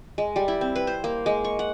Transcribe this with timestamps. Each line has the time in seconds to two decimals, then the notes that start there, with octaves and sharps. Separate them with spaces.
0.18 G#3
0.36 G3
0.48 E4
0.61 C4
0.76 B4
0.87 C5
1.04 A#3
1.26 G#3
1.44 C#6
1.59 F#5